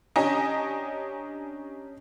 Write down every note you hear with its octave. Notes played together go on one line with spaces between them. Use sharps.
C#4 D4 G4 D#5 G#5 A#5